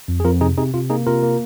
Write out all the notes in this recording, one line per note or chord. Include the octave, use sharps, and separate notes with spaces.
F2
G#4
F2 F4 A#4
C3 D#4 G#4
C3 D#4 G#4
C3 F4
A#3 D#4 G#4
C3 F4 A#4
A#3